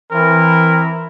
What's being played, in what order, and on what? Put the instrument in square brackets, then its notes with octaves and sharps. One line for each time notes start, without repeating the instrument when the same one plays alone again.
[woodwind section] E3 [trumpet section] C4 E4 A#4